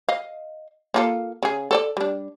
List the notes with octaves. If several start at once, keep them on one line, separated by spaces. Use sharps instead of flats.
D#5 F5
A#3 F4 A4
C#3 G#4
A4 C#5 D5
G3 D4